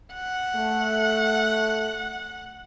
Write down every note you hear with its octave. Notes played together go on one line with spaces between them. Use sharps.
F#5
A3